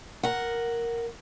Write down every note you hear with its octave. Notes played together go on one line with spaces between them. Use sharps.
A#4 F#5